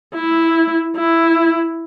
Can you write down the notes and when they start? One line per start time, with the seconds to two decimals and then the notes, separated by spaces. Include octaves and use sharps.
0.15 E4
0.96 E4